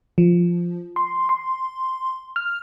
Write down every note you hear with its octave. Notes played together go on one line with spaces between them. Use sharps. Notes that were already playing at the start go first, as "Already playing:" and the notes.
F3
C6
C6
F6